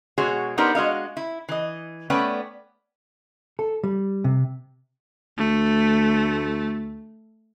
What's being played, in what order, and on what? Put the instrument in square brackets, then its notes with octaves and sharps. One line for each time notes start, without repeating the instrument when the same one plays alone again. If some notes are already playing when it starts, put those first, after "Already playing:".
[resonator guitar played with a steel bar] B2 G#3 F#4 G#4 C#5
B3 D4 D#4 G4 A#4 C5
G#3 F#4 D#5 F5
E4
E3 D#5
A3 B3 C#4 B4 D5 G5
[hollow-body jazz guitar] A4
G3
C3
[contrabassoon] D2 [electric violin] A3